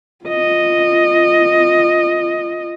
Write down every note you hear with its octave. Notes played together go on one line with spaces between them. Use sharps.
F4 D#5